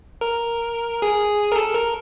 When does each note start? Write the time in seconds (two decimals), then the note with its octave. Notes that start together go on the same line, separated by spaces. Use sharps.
0.21 A#4
1.02 G#4
1.52 A#4
1.56 A4
1.74 A#4